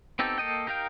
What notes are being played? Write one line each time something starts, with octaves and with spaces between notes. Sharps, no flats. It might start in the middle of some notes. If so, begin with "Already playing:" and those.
B3 C4 D#4 G4 A4
A#3 A4 D#5 G5
D#4 G4 A#4 F5 G5